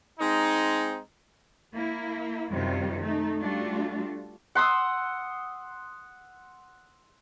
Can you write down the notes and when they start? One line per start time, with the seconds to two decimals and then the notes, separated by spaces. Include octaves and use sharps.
0.19 G#3 C4 D#4
1.73 A#3 E4
2.49 F#2 C3 D#3 G3 F4
3.01 A3 D#4
3.39 G3 A3 D4 F4 F#4
4.55 F#5 C6 D#6 E6